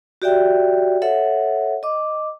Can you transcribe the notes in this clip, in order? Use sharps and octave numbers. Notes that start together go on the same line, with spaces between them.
F#4 G4 D5 E5 G5
A4 C#5 E5 F#5
D#5 D6